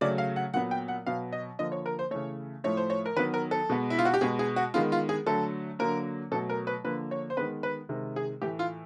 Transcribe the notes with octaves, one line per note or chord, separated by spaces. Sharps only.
C#3 F#3 A3 D5
F5
F#5
A#2 F#3 B3 F#5
G5
F#5
B2 F#3 B3 F5
D#5
D3 F3 A#3 D#5
C#5
A#4
C5
C#3 E3 A3 C#5
A2 F3 A3 C#5
C5
C#5
A#4
D#3 F#3 B3 B4
A#4
A4
B2 G#3 B3
E4
F4
F#4
G4
B2 G#3 B3 G#4
G#4
F#4
D#3 G#3 B3 F4
F4
G#4
D3 F#3 A3 A4
D3 F#3 A#3 A#4
B2 F#3 A3 A4
A#4
B4
D3 F3 A#3 B4
C#5
C5
D#3 G#3 B3 B4
B4
C3 D#3 G#3
G#4
A2 E3 A3 G4
F4